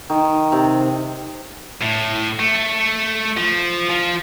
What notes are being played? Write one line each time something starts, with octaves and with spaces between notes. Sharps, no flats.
D#3
C3
A2
A3
F3
F3